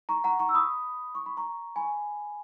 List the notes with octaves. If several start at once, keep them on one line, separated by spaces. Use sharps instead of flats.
A#5 C#6
F#5 A#5
A#5 C#6
E6
B5 D#6
C#6
B5
A#5 C#6
G#5 B5